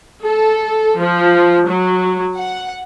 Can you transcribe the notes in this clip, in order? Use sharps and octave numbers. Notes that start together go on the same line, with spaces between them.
A4
F3
F#3
F#5